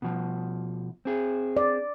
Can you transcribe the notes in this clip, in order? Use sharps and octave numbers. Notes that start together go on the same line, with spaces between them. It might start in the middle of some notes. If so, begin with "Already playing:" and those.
B2 F3
C4 G#4
D5